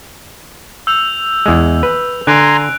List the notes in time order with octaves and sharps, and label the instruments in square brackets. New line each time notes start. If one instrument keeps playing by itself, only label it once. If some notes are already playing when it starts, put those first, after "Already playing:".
[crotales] E6 G6 F7
[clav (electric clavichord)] E2 G#3
B4
[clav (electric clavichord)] D3 [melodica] G#5 A#5 C6 [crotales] F#6 D7